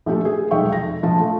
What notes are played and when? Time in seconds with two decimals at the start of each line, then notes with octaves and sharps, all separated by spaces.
0.06 A#1 A3 G4 A4
0.25 G#4
0.51 F1 B1 G#3 E5 G5 C#6
0.70 F1 A#6
1.03 A#1 F3 A5
1.19 A3